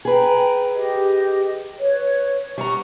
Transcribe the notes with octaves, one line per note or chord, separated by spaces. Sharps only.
G#4 B4 G5 A#5
G4 D#5
B4 C#5
G3 F#5 A#5 C#6